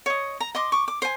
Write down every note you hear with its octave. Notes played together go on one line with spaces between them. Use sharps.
C#5 D#5
A#5
D#5 C6 D6
C#6 D6
D6
C5 G#5